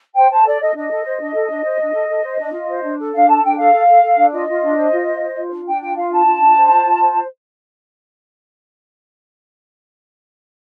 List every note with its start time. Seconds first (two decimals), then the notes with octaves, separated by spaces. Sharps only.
0.15 C5 G5
0.30 C5 A5
0.45 A4 D5
0.60 A4 D#5
0.74 D4 D#5
0.90 A4
1.04 C5
1.20 D4
1.35 A4
1.50 D4
1.64 C5
1.79 D4
1.94 A4
2.10 A4
2.23 C5
2.39 D4
2.54 F4
2.68 C5
2.83 D4
2.99 A4
3.14 D4 F5
3.28 A4 A5
3.43 D4 G5
3.57 A4 F5
3.73 A4
3.87 A4
4.02 A4
4.17 D4
4.32 F4 D#5
4.47 F4
4.62 D4
4.77 C5
4.92 F4
5.06 C5
5.22 C5
5.36 F4
5.51 D4
5.66 D4 G5
5.81 F4 G5
5.96 F4 F5
6.11 D4 A5
6.26 F4
6.40 D4
6.56 C5
6.70 F4
6.85 F4
7.00 C5